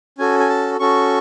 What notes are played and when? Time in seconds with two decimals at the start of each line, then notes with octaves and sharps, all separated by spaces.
0.18 C#4 F#4 A4 G#5
0.40 G#5
0.49 A5
0.79 C#4 F#4 A4 C#6